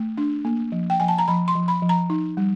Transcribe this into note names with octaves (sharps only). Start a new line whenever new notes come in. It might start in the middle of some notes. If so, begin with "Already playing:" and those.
Already playing: A3
D4
A#3
F3
G5
F3 G#5
A5
A#5
F3 B5
C6
F3
B5
F3
A#5
D#4
G3